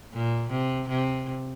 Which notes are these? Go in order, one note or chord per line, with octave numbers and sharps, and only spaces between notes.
A#2
C3
C3